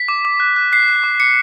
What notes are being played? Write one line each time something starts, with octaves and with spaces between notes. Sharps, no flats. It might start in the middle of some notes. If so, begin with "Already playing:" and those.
Already playing: B6
D6
D6
F#6
F#6
F#6 C7
F#6
D6
D6 C#7